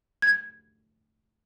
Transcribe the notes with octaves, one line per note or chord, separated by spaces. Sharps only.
G#6